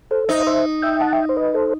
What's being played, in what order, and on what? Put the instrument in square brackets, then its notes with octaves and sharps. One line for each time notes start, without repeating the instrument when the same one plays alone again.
[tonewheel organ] A4 C5
[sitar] D#4 [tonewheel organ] C5 E5
[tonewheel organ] C5 E5
E5 G5
F#5 A5
E5 G5
C5
B4 D#5
A4 C5